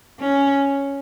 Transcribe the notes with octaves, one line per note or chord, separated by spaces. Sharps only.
C#4